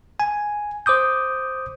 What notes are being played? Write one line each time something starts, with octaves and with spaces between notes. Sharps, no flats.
G#5
C5 D6 D#6 G6